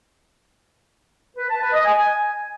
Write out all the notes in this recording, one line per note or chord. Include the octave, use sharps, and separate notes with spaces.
B4
A5
B4
D#5
G#5